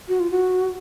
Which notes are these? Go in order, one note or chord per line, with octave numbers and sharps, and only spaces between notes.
F#4
F4
F#4